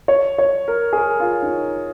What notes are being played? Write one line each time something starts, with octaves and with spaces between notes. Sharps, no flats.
C#5
C#5
A#4
G#4
A#4
F4
D#4